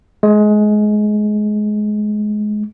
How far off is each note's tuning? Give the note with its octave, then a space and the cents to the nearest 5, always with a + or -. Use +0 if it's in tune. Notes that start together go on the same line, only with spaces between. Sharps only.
G#3 +20